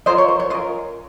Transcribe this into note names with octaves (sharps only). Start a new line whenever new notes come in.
C#4 F4 A#4 C5 D#5
C#5
C5
C#5
C#4 F4 A#4 C5 D#5